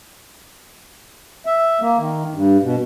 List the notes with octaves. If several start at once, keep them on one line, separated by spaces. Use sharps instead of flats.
E5
A#3
D#3
G2
B2